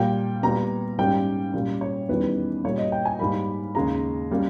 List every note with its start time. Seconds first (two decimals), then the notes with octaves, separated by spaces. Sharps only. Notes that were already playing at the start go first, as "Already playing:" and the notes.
Already playing: A#2 G3 A#3 G5
0.43 A#2 G3 B3 A#5
0.98 G#2 G3 A#3 C#4 G5
1.54 A#2 G3 A#3 C#4
1.81 C#5
2.09 E2 D#3 G3 C#4 B4
2.64 A#2 G3 A#3 C#5
2.78 D#5
2.92 G5
3.05 G#5
3.19 G#2 G3 A#3 B5
3.75 D#2 C#3 G#3 C#4 A#5
4.31 G3 A#3 C#4